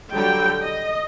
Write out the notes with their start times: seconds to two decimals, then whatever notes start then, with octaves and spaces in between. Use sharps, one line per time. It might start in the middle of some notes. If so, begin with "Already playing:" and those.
0.13 D3 F#3 G3 G5
0.62 D#5